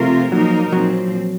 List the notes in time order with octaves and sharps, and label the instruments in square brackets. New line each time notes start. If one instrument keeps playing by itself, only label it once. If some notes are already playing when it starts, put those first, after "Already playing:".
Already playing: [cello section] C3 F3 C4 F4 A#4 [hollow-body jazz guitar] A3
[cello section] A#2 F3 A#3 D#4 A#4 [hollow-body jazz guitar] F#3
[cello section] A#2 F3 C4 [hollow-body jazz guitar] F#3